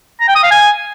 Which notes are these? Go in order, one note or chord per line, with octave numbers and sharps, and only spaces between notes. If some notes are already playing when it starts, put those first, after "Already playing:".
A#5
G5
D#6
F5
G#5